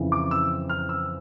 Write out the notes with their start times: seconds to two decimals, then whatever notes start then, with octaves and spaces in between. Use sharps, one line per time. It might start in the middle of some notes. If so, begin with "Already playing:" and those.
Already playing: F2 C#3 E3
0.12 D6
0.31 E6
0.69 F6
0.89 E6